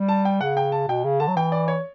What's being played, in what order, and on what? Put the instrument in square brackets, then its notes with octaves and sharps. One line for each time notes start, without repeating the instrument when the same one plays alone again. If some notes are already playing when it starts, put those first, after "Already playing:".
Already playing: [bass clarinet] G3
[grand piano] A5
G5
[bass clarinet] C#3 [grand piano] F#5
[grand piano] G5
A5
[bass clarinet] B2 [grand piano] G5
[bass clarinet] C#3
[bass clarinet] D3 [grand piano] A5
[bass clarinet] F#3
[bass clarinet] E3 [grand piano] G5
[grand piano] D5
C#5